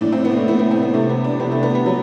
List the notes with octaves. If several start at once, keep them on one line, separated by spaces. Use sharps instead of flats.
A2 E3 D4
C4
B3
A3
A2 E3 B3
B3
C4
B3
C3 E3 A3
B3
D4
C3 E3 B3
A3
B3
B3
F#3